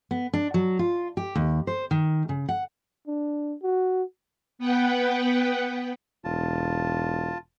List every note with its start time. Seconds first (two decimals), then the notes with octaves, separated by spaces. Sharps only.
0.11 B3
0.33 D4
0.54 F#3
0.79 F4
1.17 G4
1.35 D#2
1.67 C5
1.91 D#3
2.29 C#3
2.49 F#5
3.07 D4
3.63 F#4
4.59 B3 B4 F#5 G5
6.24 E1 F4 A5